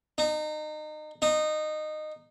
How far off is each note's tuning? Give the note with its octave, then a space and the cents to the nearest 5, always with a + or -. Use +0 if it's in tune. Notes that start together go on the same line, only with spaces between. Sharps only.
D#4 -30
D#4 -20